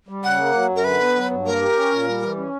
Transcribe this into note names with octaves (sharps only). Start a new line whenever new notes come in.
G3
C#3 F#5
A#3
F#3
F#2
A#4
D3 B4
B3
F#3
G2
A#3 A#4
G4
C#4
A#2
G3
E3
C#4